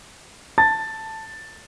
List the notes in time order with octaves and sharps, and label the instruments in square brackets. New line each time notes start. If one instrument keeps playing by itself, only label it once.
[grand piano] A5 A6